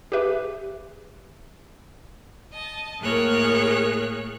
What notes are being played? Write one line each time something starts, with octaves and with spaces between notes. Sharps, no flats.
G4 G#4 B4 E5
D#5 A5
A2 A#3 G#4 A#4 C#5 F#6